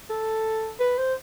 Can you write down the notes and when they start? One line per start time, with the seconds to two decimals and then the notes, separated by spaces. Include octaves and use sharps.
0.10 A4
0.80 B4
0.98 C5